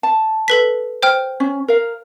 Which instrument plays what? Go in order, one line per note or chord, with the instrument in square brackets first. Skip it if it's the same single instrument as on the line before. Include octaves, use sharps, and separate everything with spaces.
[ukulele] A5
[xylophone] A4 B4 B6
C5 G5 F6
[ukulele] C#4
A#4 F5